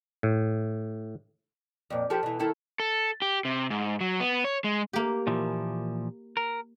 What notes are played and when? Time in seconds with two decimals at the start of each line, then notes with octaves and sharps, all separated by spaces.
0.23 A2
1.90 F2 A#2
2.10 F3 G4 A4
2.23 B2 E3
2.39 D#3 E4 A4
2.80 A4
3.22 G4
3.45 C3
3.70 G#2
4.00 F#3
4.20 B3
4.44 C#5
4.64 G#3
4.93 A#3 G4
5.27 A#2 E3 F3
6.37 A#4